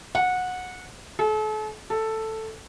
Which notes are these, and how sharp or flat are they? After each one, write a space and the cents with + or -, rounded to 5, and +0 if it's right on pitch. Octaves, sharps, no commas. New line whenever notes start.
F#5 -20
A4 -40
A4 +5